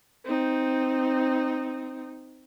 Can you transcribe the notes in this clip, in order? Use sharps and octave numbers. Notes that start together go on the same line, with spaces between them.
C4 D#4